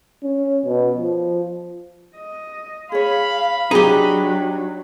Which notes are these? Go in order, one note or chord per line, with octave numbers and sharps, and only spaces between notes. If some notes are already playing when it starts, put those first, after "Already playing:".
C#4
B2
F3
D#5
G#4 C#5 F5 B5
F#3 D4 D#4 G4 G#4